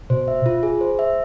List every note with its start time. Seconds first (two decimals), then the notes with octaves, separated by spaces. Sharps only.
0.10 B2 C5
0.28 E5
0.46 F4
0.63 G#4
0.81 C5
0.99 E5